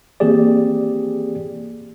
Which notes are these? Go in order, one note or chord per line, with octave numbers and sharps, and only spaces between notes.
E3 A#3 C4 G4 G#4 D5